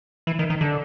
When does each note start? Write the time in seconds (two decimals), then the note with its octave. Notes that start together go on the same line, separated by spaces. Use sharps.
0.27 E3
0.39 D#3
0.50 D#3
0.61 D3